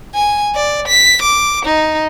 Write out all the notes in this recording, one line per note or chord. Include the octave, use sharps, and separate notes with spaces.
G#5
D5
B6
D6
D#4